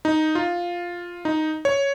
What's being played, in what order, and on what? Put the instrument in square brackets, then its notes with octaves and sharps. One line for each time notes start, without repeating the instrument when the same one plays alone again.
[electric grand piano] D#4
F4
D#4
C#5